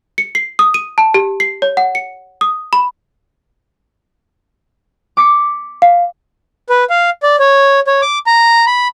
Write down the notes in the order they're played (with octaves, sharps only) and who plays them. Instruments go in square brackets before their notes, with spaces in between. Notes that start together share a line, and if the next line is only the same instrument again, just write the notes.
[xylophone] C#7
C7
D#6
D#7
A5
G4
C7
C#5
F#5
C#7
D#6
B5
[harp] D6 B6 C#7
[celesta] F5
[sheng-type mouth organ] B4
F5
D5
C#5
C#5
D6
A#5
B5